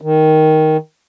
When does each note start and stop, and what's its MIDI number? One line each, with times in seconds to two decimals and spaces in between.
0.01 0.77 51